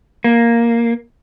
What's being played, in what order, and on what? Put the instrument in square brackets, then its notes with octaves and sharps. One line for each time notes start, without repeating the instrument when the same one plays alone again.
[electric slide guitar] A#3